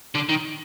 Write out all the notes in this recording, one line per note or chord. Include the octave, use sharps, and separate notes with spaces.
D3
D#3